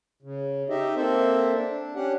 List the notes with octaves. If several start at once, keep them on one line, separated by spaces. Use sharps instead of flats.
C#3
D#4 G4 D#5 E5
A#3 C4 A4 C5 E5
D4
C#4 D4 G4 F#5